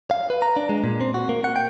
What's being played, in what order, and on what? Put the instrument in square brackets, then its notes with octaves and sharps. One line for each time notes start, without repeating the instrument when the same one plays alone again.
[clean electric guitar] F5
B4
A#5
D4
G#3
A#2
C4
F#4
A#3
F#5
G5